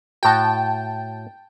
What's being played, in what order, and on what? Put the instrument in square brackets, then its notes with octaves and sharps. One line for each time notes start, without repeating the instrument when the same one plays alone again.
[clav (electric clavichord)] A2 F#4 [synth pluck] G5 A5